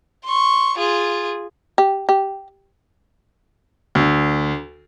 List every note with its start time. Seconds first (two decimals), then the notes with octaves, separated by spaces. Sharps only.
0.25 C6 C#6
0.78 F4 G#4
1.78 G4
2.09 G4
3.95 D2